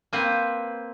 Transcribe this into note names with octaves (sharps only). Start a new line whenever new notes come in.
A#3 C4 B4 C5